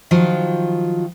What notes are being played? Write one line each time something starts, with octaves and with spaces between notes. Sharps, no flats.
D#3 F3 F#3 F4